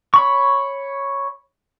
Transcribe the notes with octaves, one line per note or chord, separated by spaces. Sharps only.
C#5 B5 C#6